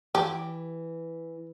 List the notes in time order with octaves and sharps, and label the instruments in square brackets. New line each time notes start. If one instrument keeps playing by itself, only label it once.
[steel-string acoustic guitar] E3 [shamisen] G4